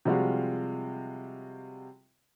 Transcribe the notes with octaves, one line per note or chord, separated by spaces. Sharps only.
C3 F3 G3 G#3 F4 F#4